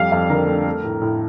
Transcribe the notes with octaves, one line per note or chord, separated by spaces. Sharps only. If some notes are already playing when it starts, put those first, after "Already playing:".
Already playing: F2 G3 F5
F2 F5
D3 A#4
A3
A3
A2
A2